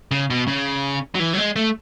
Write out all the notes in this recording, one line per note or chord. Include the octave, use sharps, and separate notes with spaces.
C#3
B2
C#3
F#3
E3
F#3
G#3
A3